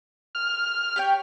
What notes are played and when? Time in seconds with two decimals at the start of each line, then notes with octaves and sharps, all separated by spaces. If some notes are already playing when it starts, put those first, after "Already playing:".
0.35 F6
0.96 G4 C#5 G5